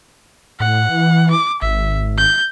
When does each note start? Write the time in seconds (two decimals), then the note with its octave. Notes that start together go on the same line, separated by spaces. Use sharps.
0.60 A2 F#5
0.89 E3
1.31 D6
1.62 G#1 E5
2.18 G6